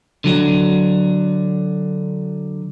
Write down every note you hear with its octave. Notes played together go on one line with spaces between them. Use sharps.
D3 F#3 F#4